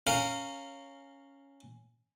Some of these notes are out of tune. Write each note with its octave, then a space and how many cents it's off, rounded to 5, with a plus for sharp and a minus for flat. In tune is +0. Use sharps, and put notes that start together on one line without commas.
C#4 +0 A#4 -20 F5 +0